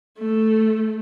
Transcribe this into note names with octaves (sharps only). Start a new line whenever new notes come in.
A3